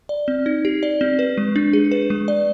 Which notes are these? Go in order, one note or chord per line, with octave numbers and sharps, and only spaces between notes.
D5
C4
D#4
G4
D5
C4
B4
G#3
D4
G#4
B4
G#3
D5